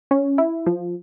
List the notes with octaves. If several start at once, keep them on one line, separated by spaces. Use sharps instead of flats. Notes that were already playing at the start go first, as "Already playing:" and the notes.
C#4
E4
F3